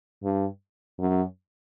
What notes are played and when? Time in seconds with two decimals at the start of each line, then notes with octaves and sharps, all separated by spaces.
0.24 G2
0.99 F#2